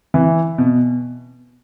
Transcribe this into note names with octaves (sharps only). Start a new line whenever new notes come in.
E3
B2